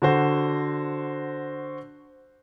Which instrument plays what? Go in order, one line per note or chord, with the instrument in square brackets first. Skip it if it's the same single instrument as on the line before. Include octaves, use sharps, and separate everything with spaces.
[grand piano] D3 F#4 C5